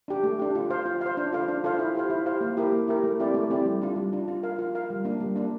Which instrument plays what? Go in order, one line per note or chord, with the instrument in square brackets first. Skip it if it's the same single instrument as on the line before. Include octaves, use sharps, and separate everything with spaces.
[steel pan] D4 G4
A3
D4 G4
F4
C5 F5
F4
C5 F5
D4
F4 A4 C5 F5
D4
F4 A4 C5 F5
E4
G4 C5 F5
E4
G4 C5 F5
A#3
E4 G4 A#4
A#3
E4 G4 A#4
A3
C4 E4 G4 D5
A3
C4 E4 G4 D5
G3
D4 F4
G3
D4 F4
F4
A#4 F5
F4
A#4 F5
G3
A#3 D4
G3
A#3 D4